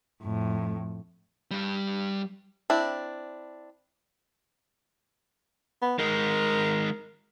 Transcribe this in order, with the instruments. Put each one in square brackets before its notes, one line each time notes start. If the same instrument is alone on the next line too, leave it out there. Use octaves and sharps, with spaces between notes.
[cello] F2 A2
[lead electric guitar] G2 G3
[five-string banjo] C4 D4 E4
[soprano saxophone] B3
[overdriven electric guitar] D#3 G#3 [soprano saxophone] A#4